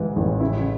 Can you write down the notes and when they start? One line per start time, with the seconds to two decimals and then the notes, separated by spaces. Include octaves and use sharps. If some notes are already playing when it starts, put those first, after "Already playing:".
Already playing: A1 G#2 E3 G3
0.16 A1
0.40 C#3 E4